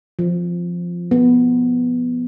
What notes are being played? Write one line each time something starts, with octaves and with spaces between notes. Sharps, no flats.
F3
B3